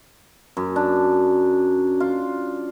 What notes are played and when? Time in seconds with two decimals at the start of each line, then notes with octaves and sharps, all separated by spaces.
0.57 F#2
0.76 D4
2.00 F4